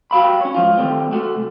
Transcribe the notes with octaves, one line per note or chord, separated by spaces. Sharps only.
G3 F#4 F5 B5
C#4 C#5
G#2 F3 F4
D#3 G3 A3 C4
A3 F#4
C2